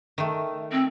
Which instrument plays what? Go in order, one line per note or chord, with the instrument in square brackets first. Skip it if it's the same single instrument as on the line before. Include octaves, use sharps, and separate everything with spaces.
[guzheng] D#3 A3
[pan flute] C4